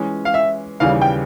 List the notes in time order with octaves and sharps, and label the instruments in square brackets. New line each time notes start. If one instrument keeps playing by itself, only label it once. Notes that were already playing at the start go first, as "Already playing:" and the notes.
Already playing: [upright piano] E3 G#3 C#4
[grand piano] F5
E5
[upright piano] D#2 C#3 E3 G3 [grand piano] F5
[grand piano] G5